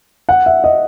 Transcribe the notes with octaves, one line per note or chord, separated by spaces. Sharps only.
F#5
E5
D#5